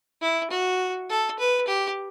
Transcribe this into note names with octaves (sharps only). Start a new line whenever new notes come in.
E4
F#4
A4
B4
G4